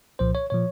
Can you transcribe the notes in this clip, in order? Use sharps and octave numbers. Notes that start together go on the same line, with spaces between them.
C2 A#2 F3 C5
C#5
A#2 F3 C#5